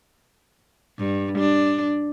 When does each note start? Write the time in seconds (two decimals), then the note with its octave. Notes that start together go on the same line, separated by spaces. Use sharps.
0.98 G2
1.39 D4